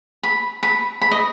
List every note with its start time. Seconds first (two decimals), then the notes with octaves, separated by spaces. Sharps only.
0.23 B5
0.63 B5
1.01 B5
1.11 D#5